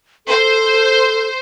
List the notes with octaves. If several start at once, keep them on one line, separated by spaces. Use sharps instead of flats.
A4 C5